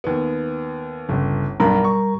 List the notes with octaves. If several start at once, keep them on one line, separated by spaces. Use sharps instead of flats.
D#2 B3
G1 C#2
B1 G2 G3 A#4 A#5 B5
C#6